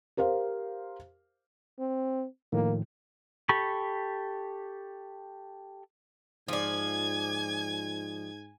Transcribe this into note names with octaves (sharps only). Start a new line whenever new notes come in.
G4 A#4 C5 F5
C4
A2 D#3 F3 A#3
G4 A4 B5 C#6
G#2 F3 D5 G#5 G#6